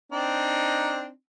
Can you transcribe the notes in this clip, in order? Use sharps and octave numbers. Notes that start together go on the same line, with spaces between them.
C4 D4 D#4